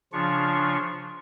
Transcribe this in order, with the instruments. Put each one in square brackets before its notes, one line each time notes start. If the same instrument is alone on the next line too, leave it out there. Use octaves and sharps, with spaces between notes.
[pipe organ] C#3 F3 D4 F4 C#6